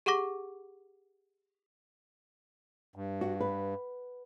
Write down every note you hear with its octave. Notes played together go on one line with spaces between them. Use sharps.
G4 G#4 F#5 C#6 D6 A#6
G2
F#4
B4